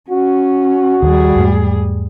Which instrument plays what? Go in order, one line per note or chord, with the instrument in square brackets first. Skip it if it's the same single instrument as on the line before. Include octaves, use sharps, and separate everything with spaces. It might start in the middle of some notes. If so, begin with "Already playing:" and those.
[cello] C#4 [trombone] F#4
[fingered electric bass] D#2 D#3 [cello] G3 G#4
[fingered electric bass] E2 G#2 A3